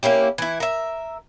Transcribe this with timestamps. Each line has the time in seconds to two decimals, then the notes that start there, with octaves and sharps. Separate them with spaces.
0.03 A#3 C#4 E4 G4
0.38 E3 E4
0.60 A#4 E5